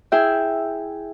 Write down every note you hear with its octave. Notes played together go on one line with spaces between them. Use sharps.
E4 G#4 E5 G5